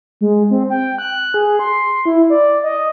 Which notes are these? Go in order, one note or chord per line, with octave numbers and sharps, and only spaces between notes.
G#3
C4
G5
F#6
G#4
C6
E4
D5
D#5